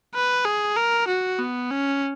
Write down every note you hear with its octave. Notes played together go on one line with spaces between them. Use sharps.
B4
G#4
A#4
F#4
B3
C#4